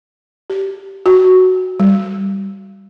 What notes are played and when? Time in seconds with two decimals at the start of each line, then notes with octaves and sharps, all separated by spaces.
0.50 G4
1.06 F#4
1.80 G3